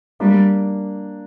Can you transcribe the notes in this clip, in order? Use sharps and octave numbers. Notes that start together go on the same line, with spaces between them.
G3 A#3 D4